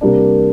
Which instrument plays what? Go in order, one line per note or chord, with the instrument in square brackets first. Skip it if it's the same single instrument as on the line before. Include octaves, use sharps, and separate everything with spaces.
[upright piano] C3 G3 A#3 D4